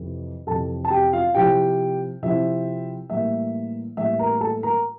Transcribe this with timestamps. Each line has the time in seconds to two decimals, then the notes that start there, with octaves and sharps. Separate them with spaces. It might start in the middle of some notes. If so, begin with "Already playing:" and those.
Already playing: F2 C3 E3
0.47 F2 C3 E3 A4 A5
0.85 A5
0.90 G4 G5
1.13 F4 F5
1.34 C3 F3 C4 E4 G4 G5
2.22 C3 F3 C4 E4 E5
3.10 A2 E3 G3 A#3 E5
3.97 A2 E3 G3 A#3 E5
4.19 A#4 A#5
4.41 A4 A5
4.63 A#4 A#5